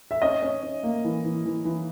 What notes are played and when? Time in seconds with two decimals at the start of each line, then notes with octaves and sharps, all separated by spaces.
0.11 E5
0.22 C#4 D#5
0.42 C#4
0.63 C#4
0.83 A#3
1.05 E3
1.24 E3
1.45 E3
1.65 E3